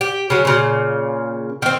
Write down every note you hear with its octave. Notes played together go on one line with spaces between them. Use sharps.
G4
C#3 F#3
A#2 C#3
D#3 C4